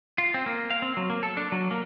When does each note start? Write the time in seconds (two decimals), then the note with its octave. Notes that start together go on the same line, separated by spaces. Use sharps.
0.18 F4
0.34 C4
0.46 A#3
0.70 F5
0.82 C4
0.97 F#3
1.10 A#3
1.23 A4
1.37 D4
1.52 F#3
1.71 A#3